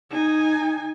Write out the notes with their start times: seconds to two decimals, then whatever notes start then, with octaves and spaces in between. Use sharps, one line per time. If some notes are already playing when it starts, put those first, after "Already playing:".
0.10 D#4 G#5